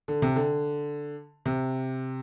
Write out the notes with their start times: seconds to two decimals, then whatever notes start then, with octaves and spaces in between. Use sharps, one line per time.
0.08 D3
0.22 C3
0.36 D3
1.46 C3